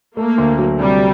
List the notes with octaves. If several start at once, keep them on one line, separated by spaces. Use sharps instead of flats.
A3 A#3
D2
F#3
C3 G3